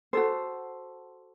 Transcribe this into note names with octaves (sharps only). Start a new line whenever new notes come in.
F#4 A4 C5